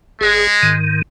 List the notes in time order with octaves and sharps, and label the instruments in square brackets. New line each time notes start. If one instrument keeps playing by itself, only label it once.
[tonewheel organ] G1 G#4 [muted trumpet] G#3
[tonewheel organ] G#2 D#3